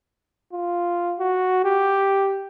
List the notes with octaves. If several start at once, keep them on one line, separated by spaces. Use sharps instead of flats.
F4
F#4
G4